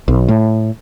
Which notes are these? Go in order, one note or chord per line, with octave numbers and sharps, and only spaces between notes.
B1
A2